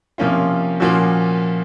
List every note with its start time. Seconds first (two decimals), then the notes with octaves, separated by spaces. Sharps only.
0.18 C3 F3 A#3 C#4 F4
0.80 A#2 F3 A#3 C#4 F#4